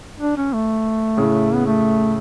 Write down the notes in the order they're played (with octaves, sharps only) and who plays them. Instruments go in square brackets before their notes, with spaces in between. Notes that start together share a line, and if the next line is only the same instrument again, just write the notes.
[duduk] D4
C#4
A3
[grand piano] A2 C#3
[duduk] B3
A3